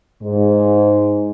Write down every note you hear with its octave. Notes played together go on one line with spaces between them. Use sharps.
G#2